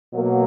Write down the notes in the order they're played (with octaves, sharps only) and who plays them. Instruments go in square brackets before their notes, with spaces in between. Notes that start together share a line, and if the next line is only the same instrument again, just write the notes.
[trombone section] B2 F#3 A#3